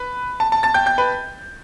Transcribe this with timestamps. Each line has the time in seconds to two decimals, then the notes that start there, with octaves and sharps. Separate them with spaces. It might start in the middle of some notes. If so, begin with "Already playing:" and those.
Already playing: B4 B5
0.40 A5
0.52 A5
0.63 A5 A6
0.74 G5 G6
0.86 G5 G6
0.98 B4 B5